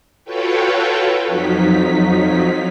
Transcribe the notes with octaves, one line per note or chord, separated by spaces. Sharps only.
F4 F#4 A4 B4 C#5 G5
F2 F3 F#3 D#4 B6